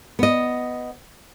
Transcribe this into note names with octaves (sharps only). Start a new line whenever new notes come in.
B3 D#5